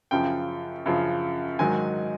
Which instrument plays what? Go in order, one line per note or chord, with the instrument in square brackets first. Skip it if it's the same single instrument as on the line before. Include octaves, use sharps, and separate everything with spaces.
[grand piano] F#2 C#3 F3 G5
F#2 C#3 F3
G#2 D#3 F#3 G#5